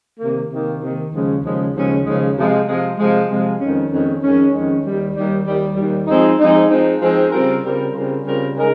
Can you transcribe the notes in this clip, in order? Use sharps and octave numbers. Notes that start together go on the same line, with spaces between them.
C3 D#3 A#3
C3 D#3 A#3
C3 D#3 A#3
D#2 C#3 F3 G#3 C#4
D#2 C#3 F3 G#3 C#4
D#2 C#3 F3 G#3 C#4
D#2 C#3 F3 G#3 C#4
C3 F3 G#3
C3 F3 G#3
C3 F3 G#3
C3 F3 G#3
F2 D#3 G#3 C#4
F2 D#3 G#3 C#4
F2 D#3 G#3 C#4
F2 D#3 G#3 C#4
D#2 D#3 G3
D#2 D#3 G3
D#2 D#3 G3
D#2 D#3 G3
F3 G#3 C4 D#4
F3 G#3 C4 D#4
F3 G#3 C4 D#4
F3 G#3 C4 D#4
C#3 G3 C4 F4 A#4
C#3 G3 C4 F4 A#4
C#3 G3 C4 F4 A#4
C#3 G3 C4 F4 A#4
C#3 G#3 D#4 A#4